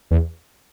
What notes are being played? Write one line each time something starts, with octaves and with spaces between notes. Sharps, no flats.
E2